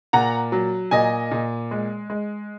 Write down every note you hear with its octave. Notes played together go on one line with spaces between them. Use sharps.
A#2 F#5 A#5
F#3
A#2 D#5 G#5
A#2
G#3
G#3